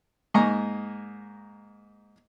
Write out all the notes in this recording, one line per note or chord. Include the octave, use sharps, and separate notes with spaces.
G#2 A#3 D#5 G#5 A#5 C#6